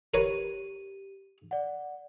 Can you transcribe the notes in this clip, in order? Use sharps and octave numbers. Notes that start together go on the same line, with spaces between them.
G4 A#4 B4 C#5 D#7
D5 F#5